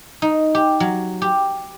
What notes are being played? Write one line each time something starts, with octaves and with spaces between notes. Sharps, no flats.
D#4
G4
F#3
G4